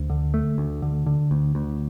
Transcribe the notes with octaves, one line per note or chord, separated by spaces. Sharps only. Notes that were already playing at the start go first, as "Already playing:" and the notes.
Already playing: D2
D3
A3
D2
D3
D3
D2
D2